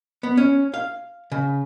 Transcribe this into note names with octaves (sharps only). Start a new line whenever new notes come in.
B3
C#4
F5
C#3